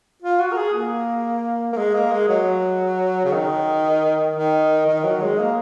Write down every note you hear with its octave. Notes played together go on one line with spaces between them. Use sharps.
F4
F#4
A#4
G#4
A#3
A#3
G#3
A#3
G#3
F#3
C#3
D#3
D#3
D#3
F#3
G#3
A#3